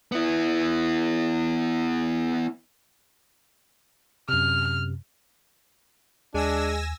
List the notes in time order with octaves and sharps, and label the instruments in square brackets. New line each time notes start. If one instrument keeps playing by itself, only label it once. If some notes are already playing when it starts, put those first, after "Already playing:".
[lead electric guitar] B3 E4
[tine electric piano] F#2 C3 [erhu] F6
[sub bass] D#2 [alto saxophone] G#3 [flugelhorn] D4 [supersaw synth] G#5 E6 A#6